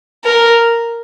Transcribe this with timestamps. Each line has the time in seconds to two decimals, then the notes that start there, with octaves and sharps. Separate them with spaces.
0.24 A#4